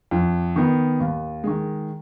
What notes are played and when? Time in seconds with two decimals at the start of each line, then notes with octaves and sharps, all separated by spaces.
0.11 F2
0.56 D#3 B3
1.00 D#2
1.44 D#3 G#3